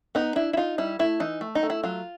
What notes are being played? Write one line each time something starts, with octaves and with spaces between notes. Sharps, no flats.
B3 D#4
D4 E4
E4
D#4 F4
G3 E4
A3 E4
E3 D#4
A3
D#4
A3
E4
F#3 F4